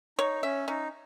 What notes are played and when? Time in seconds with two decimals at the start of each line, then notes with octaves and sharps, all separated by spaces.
0.18 D#4 C#5
0.43 C#4 E5
0.68 C#4 D#4